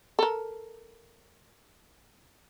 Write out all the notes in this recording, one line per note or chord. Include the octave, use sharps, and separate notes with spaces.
A4 A#4